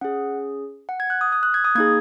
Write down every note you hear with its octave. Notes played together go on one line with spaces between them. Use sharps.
C#4 G#4 F#5
F#5
G#6
F#6
D#6
D#6
F#6
G#6
D#6
A#3 D#4 G#4 G#6